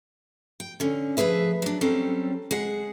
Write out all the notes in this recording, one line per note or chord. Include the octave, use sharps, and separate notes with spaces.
G5
D3 C#4
F3 A3 G#4 B4 E5
F#3 D4
F#3 G3 C4 C#4 A4
G#3 G#4 F#5